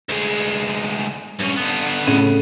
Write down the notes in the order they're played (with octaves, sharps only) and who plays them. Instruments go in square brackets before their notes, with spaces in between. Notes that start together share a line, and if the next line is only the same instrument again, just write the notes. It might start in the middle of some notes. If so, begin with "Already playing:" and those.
[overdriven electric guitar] D2 G#3
G2 C#4
D3 B3
[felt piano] A2 C#3 D#7